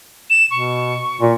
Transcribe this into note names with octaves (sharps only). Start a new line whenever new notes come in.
E7
B2 C#6
A#2